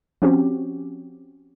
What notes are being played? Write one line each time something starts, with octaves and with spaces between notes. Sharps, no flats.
F3 C4 C#4 F#4 G4